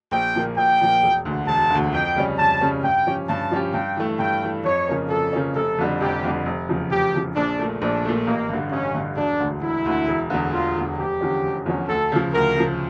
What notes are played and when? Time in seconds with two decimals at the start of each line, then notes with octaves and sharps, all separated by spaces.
0.12 A#1 G5
0.35 A#2 F3 A#3
0.57 A#1 G5
0.81 A#2 F3 A#3
1.03 E1
1.25 D2 D3
1.47 E1 A5
1.70 D2 D3
1.93 F2 G5
2.16 C#3 G3 C#4
2.39 F2 A5
2.61 C#3 G3 C#4
2.83 G2 G5
3.06 F3 C#4 G4
3.29 G2 A5
3.51 F3 C#4 G4
3.74 G2 G5
3.97 E3 A3
4.19 G2 G5
4.43 E3 A3
4.64 F2 C#5
4.88 C#3 F3 A#3 C#4
5.10 F2 A4
5.33 C#3 F3 A#3 C#4
5.55 F1 A4
5.78 F2 D3 G3
6.00 F1 G4
6.23 F2 D3 G3
6.46 F1
6.69 E2 C#3 F3
6.91 F1 G4
7.14 E2 C#3 F3
7.36 A#1 D4
7.59 A#2 A3
7.82 A#1 D4
8.05 A#2 A3
8.26 A1 A#3
8.49 G2 D3
8.72 A1 C#4
8.95 G2 D3
9.17 E1 D4
9.40 D2 D3
9.63 E1 E4
9.85 D2 D3
10.08 E1
10.30 E2 D3
10.53 E1 F4
10.76 E2 D3
10.98 F1 G4
11.21 E2 D3 F3 C#4
11.44 F1
11.66 E2 D3 F3 C#4
11.89 D2 A4
12.12 C#3 F3
12.34 D2 A#4
12.57 C#3 F3